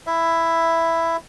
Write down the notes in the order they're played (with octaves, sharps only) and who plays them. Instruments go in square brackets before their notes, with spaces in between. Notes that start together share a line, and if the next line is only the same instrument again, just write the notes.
[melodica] E4 E5